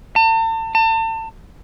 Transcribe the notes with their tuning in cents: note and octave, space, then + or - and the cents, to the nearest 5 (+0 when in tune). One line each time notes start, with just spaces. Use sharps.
A5 +40
A5 +35